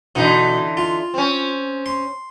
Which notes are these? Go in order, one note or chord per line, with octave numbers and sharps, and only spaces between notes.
B2 D3 E3 D#4
F4
C4 C#4
C6